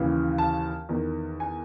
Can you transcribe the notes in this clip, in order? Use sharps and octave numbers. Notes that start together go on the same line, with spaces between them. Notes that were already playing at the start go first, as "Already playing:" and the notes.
Already playing: D#2 C#3 E3
A5
E2 D#3
G#5